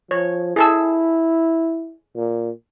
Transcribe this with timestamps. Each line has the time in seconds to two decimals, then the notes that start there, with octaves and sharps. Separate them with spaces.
0.11 F3 C#5
0.56 E4 G#4 A4 E6
2.16 A#2